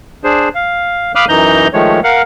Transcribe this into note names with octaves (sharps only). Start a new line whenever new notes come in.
D4 G#4 C5
F5
F5 B5 D6 D#6 F6 F#6
F#2 E3 D#4 A#5 G6
D#3 F3 G#3 A3 C#5
A#4 F5 F#5